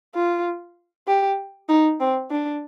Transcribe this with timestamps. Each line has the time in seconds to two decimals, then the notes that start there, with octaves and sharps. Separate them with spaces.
0.15 F4
1.07 G4
1.69 D#4
2.00 C4
2.31 D4